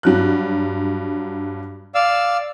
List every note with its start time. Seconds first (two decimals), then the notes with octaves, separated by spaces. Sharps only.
0.03 G2 F#3 F#6
1.95 D5 F5 E6